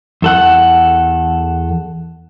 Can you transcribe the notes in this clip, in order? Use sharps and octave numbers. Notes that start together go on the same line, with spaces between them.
E2 A4 F#5